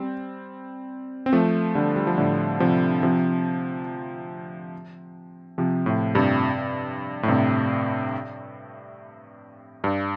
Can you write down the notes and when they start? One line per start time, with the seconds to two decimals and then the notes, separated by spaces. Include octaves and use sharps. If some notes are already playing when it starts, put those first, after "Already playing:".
Already playing: G3 C4
1.26 C4
1.33 F3 A3
1.75 D3 G3
1.96 G3
2.07 F3
2.18 A2 D3
2.60 C3 F3
3.03 C3 F3
5.58 C3 F3
5.86 A2
6.15 G2 C3
7.23 A2
7.28 G2 C3
9.84 G2